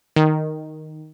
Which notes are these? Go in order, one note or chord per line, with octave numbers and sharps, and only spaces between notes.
D#3